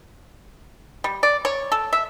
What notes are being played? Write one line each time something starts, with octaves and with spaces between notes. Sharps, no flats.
G3
D5
C#5
A4
E5